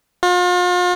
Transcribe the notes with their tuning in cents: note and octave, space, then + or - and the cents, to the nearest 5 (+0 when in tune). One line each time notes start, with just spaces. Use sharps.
F4 +40